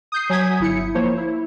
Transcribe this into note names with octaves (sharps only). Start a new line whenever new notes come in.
D#6 G6 C7
F#3 G#5 D#6 G6 G#6 B6
G1 E4 C#7
F3 A#3 C5 C#5
E4